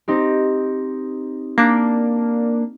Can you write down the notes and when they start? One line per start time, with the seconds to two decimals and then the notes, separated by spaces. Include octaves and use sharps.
0.08 C4 D#4 G4
1.58 A#3 D4